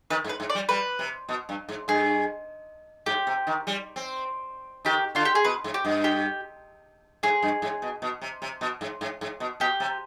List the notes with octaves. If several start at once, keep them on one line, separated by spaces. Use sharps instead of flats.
D#3 B4
G#2
B4
G#2
D5
G3
G3 B4
C3
B2
G2
G#2
G2 G#4
G#2 G4
C3
D#3
G3
C4
D#3 G4
D3 F4
G4
G#4
B2 B4
G#2
G4
G2
G4
G#2 G#4
G2
G#2
B2
B2
C3
C3
B2
G#2
G#2
G#2
B2
B2 G4
C3